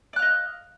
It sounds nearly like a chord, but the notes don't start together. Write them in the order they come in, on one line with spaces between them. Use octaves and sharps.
D5 F#6 F5 D#5